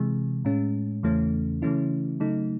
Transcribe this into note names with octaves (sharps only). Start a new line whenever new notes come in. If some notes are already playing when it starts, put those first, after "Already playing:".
Already playing: C3 E3 G#3
A2 G#3 C#4
E2 C#3 E3 A3 C#4
C#3 E3 A3 C#4 E4
C#3 F#3 A3 D#4